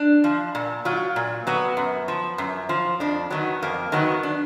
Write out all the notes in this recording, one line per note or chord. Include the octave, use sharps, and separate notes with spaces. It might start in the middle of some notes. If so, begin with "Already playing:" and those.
Already playing: D4
F3
A#2
F#3 F4
A#2
F#3 B3
F#2
F3
F#2
F3
F2 D4
D#3 F#3 B3
F2 A#3
D#3 F#3 B3
D4